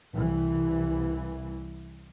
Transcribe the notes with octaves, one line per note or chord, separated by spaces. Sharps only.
C2 E3